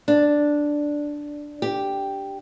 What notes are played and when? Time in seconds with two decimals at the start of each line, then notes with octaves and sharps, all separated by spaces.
0.08 D4
1.62 G4